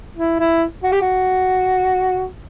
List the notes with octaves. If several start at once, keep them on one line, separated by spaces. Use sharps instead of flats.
E4
E4
F#4
G4
F#4